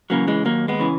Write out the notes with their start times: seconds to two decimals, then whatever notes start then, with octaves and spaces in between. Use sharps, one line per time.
0.10 C#3 E3 F#3 A#3
0.27 E3 G#3
0.45 D#2 F#3 A#3
0.68 G#3 B3
0.80 C#3 E3